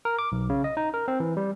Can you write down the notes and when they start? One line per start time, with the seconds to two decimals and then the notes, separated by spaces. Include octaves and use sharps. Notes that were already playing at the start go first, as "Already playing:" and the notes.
0.05 A#4
0.19 D6
0.32 B1
0.50 C#3
0.64 D#5
0.77 D#4
0.94 A#4
1.08 C4
1.20 E3
1.37 G3